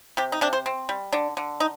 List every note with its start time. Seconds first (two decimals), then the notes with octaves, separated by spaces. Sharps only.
0.17 C3 G4
0.32 D#4
0.41 C3 D4
0.53 C5
0.66 C4
0.89 G3
1.13 D3 D4
1.37 D3
1.60 D#4